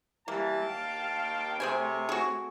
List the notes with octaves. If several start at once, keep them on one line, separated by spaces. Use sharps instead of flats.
E3 G3 A#3 A5
D#2 F5 G5
C3 A3 C4 G#4 C5 C#5 G#5
F#4 G#4